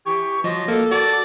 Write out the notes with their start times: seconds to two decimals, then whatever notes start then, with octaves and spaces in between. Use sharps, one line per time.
0.06 E3 G4 C#6
0.44 F3 F#3 D#5
0.68 A#3 A4
0.91 F#4 D5 A5